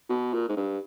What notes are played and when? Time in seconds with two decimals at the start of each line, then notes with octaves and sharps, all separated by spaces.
0.10 B2
0.34 A#2
0.49 G#2
0.57 G2